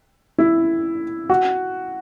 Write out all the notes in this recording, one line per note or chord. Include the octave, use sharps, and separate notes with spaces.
E4
F#4